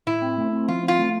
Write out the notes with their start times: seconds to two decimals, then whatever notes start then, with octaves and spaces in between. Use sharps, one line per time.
0.07 A2 E4
0.22 C4
0.37 A3
0.52 C4
0.68 F3 F4
0.83 C4
0.88 F4
0.98 A3